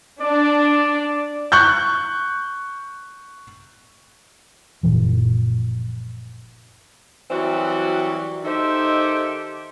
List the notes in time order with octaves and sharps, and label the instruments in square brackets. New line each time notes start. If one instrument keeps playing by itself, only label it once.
[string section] D4 [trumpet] D5
[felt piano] C#6 F#6 G6
[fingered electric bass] F#1 A#2 E3 F3
[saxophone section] E3 F#3 G3 C4 F#4
D#3 G4 A4 C5 D#5 E5